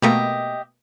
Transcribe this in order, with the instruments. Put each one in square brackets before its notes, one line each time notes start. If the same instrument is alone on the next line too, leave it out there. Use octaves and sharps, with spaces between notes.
[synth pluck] B2 A3 A#3 [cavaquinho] G4 D#5 E5